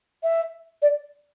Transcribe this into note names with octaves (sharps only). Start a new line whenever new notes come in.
E5
D5